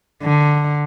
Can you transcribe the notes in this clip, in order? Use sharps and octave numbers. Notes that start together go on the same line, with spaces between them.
D3